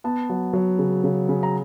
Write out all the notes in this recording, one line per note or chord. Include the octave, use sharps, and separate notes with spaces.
B3 A5
F#3
F#3
C#3
C#3
C#3
A#5